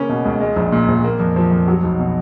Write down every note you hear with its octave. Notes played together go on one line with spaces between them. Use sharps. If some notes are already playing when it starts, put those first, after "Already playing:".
Already playing: C#3 A#3 C#4
B2
C#2
G#3
A#1
A#2
A#1
A#3
F2
F3
F2
F#3
B1
B2